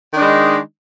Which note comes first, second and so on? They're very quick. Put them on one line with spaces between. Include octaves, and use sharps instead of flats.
D#3 D4 D#4 G#3